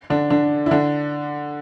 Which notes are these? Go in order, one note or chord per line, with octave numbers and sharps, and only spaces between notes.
D3 D4
D3 D4
E4
D3 D4